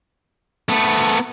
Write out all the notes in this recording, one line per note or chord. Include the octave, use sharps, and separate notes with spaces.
A3 B3